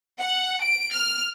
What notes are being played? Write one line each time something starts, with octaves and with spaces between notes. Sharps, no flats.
F#5
D7
F6